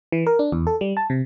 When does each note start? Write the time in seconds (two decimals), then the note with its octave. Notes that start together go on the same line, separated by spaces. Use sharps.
0.12 E3
0.27 A#4
0.39 D4
0.52 E2
0.67 A4
0.81 G3
0.97 A5
1.10 C3